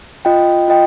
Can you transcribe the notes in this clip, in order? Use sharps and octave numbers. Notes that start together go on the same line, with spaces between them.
F4 D#5 G5
F4 D#5 G5